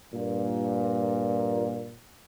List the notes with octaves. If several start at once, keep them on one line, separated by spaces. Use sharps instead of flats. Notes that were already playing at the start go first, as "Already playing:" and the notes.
G2 A#2